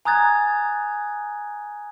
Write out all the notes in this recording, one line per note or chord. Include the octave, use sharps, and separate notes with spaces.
G#5 A#5 D#6 F#6 G#6 A6